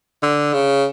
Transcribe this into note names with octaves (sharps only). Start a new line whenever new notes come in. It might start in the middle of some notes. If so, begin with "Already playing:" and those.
D3
C#3